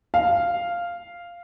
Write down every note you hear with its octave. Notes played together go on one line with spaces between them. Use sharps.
F5